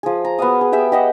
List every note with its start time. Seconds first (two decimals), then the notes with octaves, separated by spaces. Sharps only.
0.03 F3 G#4
0.25 A#5
0.38 B3 F#4 F5 D#6
0.61 G#4
0.72 G4 G#4 E5 G5
0.92 G4 D#5 F#5